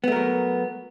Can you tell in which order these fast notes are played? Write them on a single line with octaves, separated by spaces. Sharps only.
B3 A3 A#4 F#3